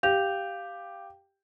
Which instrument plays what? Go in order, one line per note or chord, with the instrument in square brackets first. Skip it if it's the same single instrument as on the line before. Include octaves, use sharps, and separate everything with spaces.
[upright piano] G4 [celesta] F5 G6 F7